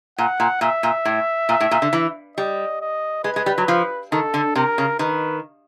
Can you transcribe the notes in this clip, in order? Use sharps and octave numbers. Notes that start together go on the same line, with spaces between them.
A#2 F#5
A#2
A#2 E5
A#2
A2
A#2
A2
A#2
D3
E3
G3 D#5
D#5
G#3 B4
G#3
G3
F#3
F3
D#3 A4
D3
C3 A#4
C#3
D#3 B4